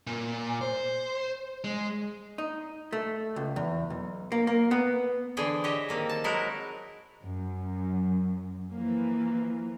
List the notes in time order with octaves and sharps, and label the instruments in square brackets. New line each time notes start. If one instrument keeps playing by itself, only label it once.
[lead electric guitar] A#2
C5
G#3
[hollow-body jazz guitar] D#4
A3
C#2
E2
B1
A#3
A#3
B3
[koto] D3 E3 G#4 C5 G5
G4 C5 C#5 D#5 E5
D#3 A#3 C4
A5
F#3 G#3 D#4 E4 F#4 A#4
[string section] F#2
E3 F3 A#3